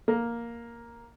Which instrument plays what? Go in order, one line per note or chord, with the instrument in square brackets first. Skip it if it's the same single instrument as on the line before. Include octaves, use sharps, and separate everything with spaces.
[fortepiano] A#3